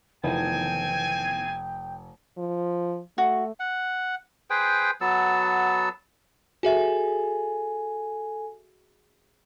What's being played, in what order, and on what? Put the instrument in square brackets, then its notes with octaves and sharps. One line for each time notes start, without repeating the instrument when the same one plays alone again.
[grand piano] F1 [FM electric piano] D#3 E3 B3 [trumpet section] C4 G#5 [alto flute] G5
[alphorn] F3
[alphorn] A3 [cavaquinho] F#4
[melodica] F#5
G#4 B4 C5 G5
F#3 B3 A4 E6
[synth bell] F#4 G#4 E5 [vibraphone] A4 G#5